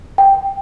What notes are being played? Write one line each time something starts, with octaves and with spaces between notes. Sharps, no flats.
G5